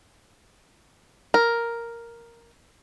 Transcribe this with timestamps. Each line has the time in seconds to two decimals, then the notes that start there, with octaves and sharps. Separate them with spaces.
1.34 A#4